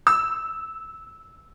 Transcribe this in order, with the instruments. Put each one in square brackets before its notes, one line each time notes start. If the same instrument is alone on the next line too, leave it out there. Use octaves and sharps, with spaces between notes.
[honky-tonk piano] E6